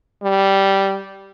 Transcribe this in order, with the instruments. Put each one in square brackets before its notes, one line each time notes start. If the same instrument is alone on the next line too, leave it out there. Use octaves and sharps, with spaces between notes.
[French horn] G3